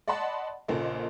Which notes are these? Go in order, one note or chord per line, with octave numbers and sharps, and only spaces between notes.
D5 D#5 F#5 A5 B5 C6
A#1 A#2 C#3 A#3 A4 D#5